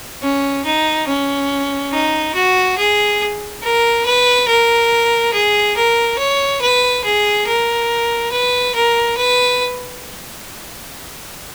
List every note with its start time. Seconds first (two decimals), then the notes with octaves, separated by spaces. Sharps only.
0.22 C#4
0.65 D#4
1.08 C#4
1.92 D#4
2.35 F#4
2.78 G#4
3.62 A#4
4.05 B4
4.48 A#4
5.33 G#4
5.76 A#4
6.19 C#5
6.62 B4
7.04 G#4
7.47 A#4
8.32 B4
8.75 A#4
9.17 B4